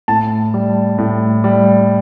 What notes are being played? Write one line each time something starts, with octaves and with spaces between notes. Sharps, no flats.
A2 A5
G3
A2
G3